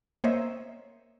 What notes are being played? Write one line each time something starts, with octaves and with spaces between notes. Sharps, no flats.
A#3 C5 C#5 D#5 E5